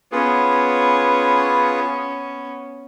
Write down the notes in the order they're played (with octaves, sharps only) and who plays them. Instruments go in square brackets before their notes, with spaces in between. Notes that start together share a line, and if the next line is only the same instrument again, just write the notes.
[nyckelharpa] B3 C#4 [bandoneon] F4 G#4 B4